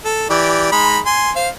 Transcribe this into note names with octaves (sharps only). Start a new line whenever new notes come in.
A4
E3 G4 D5
G#3 D#4 B5
G#5 C6
C5 F5